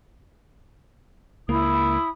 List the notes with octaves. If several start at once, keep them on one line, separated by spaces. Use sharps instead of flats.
C#2 A#3 E4 B5 D#6